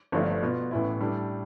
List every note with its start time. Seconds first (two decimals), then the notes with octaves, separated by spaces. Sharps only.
0.12 G1 G2 F3 A3
0.42 B2 B3 F4
0.71 A1 A2 E3 B3 E4
1.00 A2 G3 D4 A4